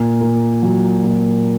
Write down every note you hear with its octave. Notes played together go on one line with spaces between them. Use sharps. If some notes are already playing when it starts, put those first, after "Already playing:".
Already playing: A#2
A#3
F#3
A#2